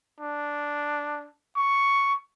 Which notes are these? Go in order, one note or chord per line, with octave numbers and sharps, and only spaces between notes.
D4
C#6